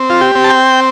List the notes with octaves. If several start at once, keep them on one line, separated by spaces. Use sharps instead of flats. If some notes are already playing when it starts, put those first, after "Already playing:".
Already playing: C4
F4
G4
C4
A5
G5